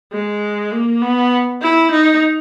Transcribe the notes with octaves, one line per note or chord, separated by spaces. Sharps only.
G#3
A#3
B3
E4
D#4